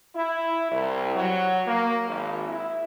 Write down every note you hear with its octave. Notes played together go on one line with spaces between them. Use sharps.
E4
C2
F#3
A#3
G#1
E4